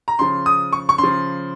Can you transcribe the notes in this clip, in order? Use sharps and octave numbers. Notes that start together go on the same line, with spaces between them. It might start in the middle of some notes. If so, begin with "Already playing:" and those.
A#5
C#3 F3 C6
D#6
C#6
C#6
C#3 C6
F3